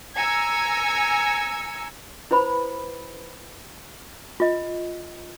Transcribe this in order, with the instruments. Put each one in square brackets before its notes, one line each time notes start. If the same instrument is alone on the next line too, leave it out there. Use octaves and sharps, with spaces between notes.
[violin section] G#5 A#5 E6 G#6 C#7
[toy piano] E4 B4 C5 B5
F4 D#5